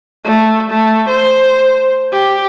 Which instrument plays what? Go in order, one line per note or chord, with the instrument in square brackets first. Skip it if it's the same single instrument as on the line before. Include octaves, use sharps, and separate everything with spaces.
[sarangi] A3
A3
C5
G4